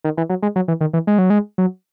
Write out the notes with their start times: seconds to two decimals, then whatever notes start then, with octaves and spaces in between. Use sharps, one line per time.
0.04 D#3
0.17 E3
0.30 F#3
0.42 G#3
0.56 F#3
0.68 E3
0.81 D#3
0.93 E3
1.07 G#3
1.18 F#3
1.30 G#3
1.58 F#3